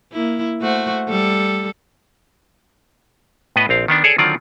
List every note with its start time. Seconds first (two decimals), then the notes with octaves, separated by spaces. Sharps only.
0.13 A#3 E4
0.61 A3 F#4 C5
1.08 G3 A4
3.56 A2 B3 B4 D#5
3.69 A#1 C4 F5
3.88 D#3 B3 D4
4.04 G#4 A4 C#5 D5 G#5
4.18 D3 D#3 F#3 C4 F4 D5